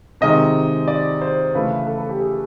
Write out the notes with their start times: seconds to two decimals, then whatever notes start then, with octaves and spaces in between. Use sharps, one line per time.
0.21 C3 D#3 G#3 D#5
0.88 D5
1.21 C5
1.55 C#3 E3 A3 B4
1.87 A4
1.98 A4
2.09 G4
2.20 G#4